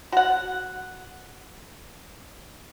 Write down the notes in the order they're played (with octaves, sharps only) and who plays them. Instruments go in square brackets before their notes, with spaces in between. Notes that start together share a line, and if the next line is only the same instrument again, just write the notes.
[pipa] F#4 F#5